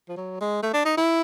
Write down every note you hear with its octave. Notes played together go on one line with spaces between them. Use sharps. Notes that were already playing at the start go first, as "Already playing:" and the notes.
F3
F#3
G#3
A3
D4
D#4
E4